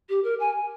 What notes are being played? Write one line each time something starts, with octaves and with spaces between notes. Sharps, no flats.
G4
A#4
G#5